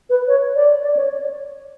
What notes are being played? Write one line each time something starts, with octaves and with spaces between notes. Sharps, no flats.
B4
C#5
D5
D5
C#5